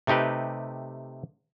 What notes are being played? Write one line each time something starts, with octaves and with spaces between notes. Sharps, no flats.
C3 A3 D#4 G4 B4